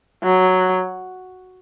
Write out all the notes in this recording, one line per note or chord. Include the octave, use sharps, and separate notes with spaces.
F#3